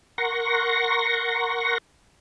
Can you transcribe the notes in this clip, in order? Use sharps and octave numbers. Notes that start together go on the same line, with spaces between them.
A#4 F#5 C6 C#6 A#6